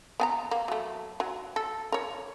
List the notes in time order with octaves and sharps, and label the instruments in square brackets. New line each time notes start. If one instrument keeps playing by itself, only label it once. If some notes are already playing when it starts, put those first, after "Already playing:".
[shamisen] B3 G#5 A#5
A#3
F#3 A3
F#3
A4
A#4 C#5